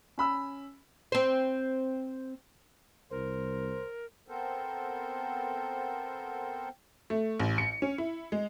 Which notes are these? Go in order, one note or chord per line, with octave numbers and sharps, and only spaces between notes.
C#4 B5 E6
C4 C5
C2 A#4 C5
B3 C4 A4 A#4 C5
A3
A1
C#7
C#4
E4
G#3